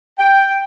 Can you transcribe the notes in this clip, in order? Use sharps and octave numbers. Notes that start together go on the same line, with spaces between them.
G5